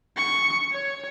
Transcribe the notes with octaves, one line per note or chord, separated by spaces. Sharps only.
C#6
C#5